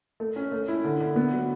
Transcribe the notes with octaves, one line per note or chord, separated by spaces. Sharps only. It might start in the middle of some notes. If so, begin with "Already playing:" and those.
A3
C#4
A3
E4
D3
D3
B3
F#3